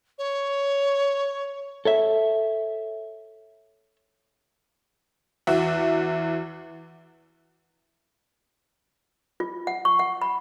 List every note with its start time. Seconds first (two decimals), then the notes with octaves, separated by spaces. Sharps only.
0.18 C#5
1.85 A4 C#5 E5
5.47 E2 F#4 E5
9.40 F4
9.67 F#5
9.85 C#6
9.99 F#5
10.21 B5